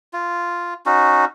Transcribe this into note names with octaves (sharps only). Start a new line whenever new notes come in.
F4
C#4 D#4 F#4